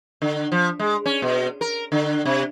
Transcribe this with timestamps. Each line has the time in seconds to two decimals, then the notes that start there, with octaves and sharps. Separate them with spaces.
0.22 D3
0.52 F3
0.79 G#3
1.06 C#4
1.22 B2
1.61 A#4
1.92 D3
2.25 C3